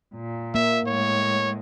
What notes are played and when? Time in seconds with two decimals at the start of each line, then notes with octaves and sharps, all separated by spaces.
0.15 A#2
0.55 A#3 E5
0.87 A2 G#3 C#5